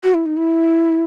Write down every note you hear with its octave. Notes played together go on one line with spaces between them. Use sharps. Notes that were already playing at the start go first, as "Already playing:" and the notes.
F#4
E4
D#4
E4